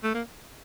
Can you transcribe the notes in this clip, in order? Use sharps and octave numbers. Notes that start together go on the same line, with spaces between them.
A3
A#3